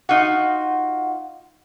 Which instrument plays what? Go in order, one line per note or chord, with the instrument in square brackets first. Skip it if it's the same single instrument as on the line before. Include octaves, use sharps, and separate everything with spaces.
[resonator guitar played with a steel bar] D#4 F#5 [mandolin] F4 F#4